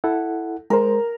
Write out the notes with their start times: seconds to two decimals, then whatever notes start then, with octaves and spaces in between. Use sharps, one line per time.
0.04 E4 A4 F#5
0.70 G#3 A#4 C5